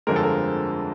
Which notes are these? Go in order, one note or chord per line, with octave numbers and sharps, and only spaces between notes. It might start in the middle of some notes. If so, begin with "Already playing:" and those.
G1 F2 D3 F3 G#3 A#4
A4
A#4